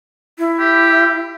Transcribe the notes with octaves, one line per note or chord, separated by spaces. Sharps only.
E4
G4